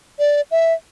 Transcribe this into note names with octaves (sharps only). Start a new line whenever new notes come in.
D5
E5